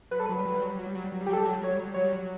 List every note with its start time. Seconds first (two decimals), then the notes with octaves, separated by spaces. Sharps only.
0.11 F#3 B4
0.20 G3 A4
0.26 F#3 B4
0.37 G3
0.45 F#3
0.54 G3
0.62 F#3
0.70 G3
0.79 F#3
0.87 G3
0.95 F#3
1.04 G3
1.12 F#3
1.21 G3
1.26 F#3 G4
1.33 G3 A4
1.45 F#3
1.54 G3
1.62 F#3 C#5
1.71 G3
1.79 F#3
1.88 G3
1.94 F#3 C#5
2.04 G3
2.12 F#3